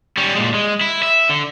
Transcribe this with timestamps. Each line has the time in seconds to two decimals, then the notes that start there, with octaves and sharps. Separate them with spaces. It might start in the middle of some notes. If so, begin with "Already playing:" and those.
0.17 G3 C#4
0.35 A#2 G#3
0.54 G#3
0.81 E4
1.03 E5
1.29 D3